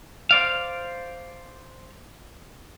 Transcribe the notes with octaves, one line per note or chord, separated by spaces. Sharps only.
C5 D5 F5